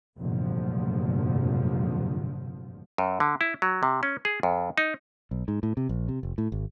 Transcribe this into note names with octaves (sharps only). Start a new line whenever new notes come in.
F1 A#1 G2 D3 F3 F#3
F#2
D3
E4
F#3
C3
C#4
G#4
F2
D#4
B1
G#2
A2
C3
A#1
C3
F1
A2
G#1